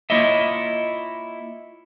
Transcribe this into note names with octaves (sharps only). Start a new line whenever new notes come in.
A#3 E4 F4 C#5 D#5 E5